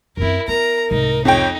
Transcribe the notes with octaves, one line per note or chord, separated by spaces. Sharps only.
F#2 C4 E4 A#4
B3 A#4 A#5
C2 G#2 D#4
F2 D#4 C#5 G5